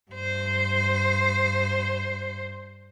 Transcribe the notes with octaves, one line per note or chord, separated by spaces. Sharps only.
G2 C5